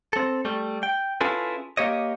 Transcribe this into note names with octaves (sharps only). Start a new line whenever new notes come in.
C4 A4
G3 A3
G5
C#4 E4 F4 G#4 A4 B4
A#3 G4 C#5 D#5